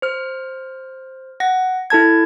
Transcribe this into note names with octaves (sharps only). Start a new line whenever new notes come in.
C5 F6
F#5 A#6
E4 A4 A5 G#6